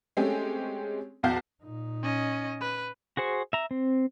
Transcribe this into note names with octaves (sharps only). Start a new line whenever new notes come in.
G#3 A3 C4 C#4 G4 G#4
B1 E2 F#4 F5 A5 G6
A#2 D#4
C#4 D#5
B4
F#4 G#4 C5 C#6
E5 A#5
C4